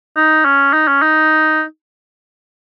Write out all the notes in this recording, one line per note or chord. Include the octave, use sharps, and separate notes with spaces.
D#4
C#4
D#4
C#4
D#4